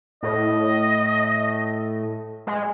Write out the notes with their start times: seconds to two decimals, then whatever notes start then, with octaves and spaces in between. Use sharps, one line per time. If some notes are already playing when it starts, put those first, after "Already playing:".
0.23 A2 D#5
2.47 G#3